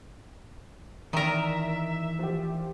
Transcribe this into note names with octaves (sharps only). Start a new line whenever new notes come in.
D#3 E3 A#4 D5 E5 A#5
F3 G4